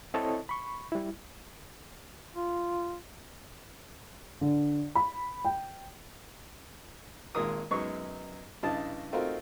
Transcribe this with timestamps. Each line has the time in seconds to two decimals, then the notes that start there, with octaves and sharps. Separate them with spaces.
0.14 C4 E4 A4 C#5 D#5 A5
0.49 B5 C#6
0.92 G3 E4
2.35 F4
4.41 D3
4.95 B5
5.45 G5
7.35 G#1 A#2 D#3 G#3 A#4 D#6
7.71 F#2 F#3 G#3 B3 D#4 C#6
8.63 G2 C#3 E4 D#5 A5
9.12 A3 C4 D#4 F4 F#4 A#4